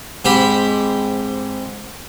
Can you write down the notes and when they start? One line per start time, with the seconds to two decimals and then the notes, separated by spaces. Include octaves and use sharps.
0.25 G#2 C4 G4 B5